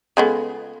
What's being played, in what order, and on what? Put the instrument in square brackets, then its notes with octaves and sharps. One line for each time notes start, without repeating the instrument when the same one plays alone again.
[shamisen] C#3 G#3 B3 [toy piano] F4 A4 F5